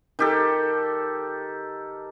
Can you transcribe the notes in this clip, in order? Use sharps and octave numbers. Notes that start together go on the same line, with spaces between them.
D#3 G4 A4